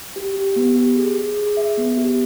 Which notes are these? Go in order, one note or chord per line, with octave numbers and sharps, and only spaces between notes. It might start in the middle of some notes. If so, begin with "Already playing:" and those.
G4
G4
B3
G4
G#4
G#4
G#4
E5
B3
G4